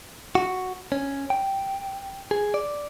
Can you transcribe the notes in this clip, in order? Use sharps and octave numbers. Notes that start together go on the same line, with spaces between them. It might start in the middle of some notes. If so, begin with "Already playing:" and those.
F#4
C#4
G5
G#4
D5